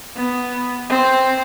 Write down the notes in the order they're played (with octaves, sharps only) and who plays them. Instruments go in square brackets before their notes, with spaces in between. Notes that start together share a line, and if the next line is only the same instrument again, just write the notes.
[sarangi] B3
C4